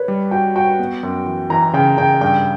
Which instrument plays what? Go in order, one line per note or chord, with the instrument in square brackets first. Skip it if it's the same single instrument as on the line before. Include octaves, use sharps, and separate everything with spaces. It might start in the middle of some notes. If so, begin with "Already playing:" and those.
Already playing: [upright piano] B4 C#5
[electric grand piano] G3
[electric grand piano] F#4 [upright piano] G5
[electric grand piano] F#4 [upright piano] G5
[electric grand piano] B3
F#2
E3
[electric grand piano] E3 [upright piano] A#5
[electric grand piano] C#3 [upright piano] G5
[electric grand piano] C#3 [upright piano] G5
[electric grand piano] G2 [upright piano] G5